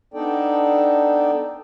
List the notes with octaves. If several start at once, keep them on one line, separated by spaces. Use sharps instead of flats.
B3 D4 D#4 A4 D5 G5